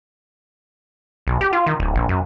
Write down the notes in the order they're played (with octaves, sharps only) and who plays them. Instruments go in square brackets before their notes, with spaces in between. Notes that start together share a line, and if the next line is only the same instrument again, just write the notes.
[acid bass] B1
G4
F4
D#3
D1
A#1
F#2